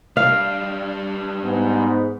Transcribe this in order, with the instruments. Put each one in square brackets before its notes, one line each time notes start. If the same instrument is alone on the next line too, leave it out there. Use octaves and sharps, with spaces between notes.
[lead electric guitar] G3 D4 [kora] F5
[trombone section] G#2 B3